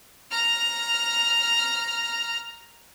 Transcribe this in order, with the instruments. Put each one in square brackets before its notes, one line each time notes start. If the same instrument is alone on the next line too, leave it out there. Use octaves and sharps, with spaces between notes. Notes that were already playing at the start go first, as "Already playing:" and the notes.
[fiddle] A#5 F6